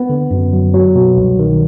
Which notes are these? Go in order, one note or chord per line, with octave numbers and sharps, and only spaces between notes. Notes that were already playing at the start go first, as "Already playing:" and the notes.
Already playing: B3
D3
F#2
F#3
F#3
B2
C2
D#3